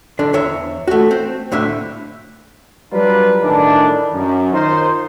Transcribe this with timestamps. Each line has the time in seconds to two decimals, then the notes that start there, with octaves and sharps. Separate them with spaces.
0.19 D3 D4
0.33 E2 C#5 E5
0.88 A3 F#4
1.11 C4
1.51 C2 A2 D3 E5
2.93 F#3 G3 D4 F4 A#4 B4
3.43 A2 D#3 E3 G3 D4
4.13 F#2
4.53 D#3 D#4 F4 C5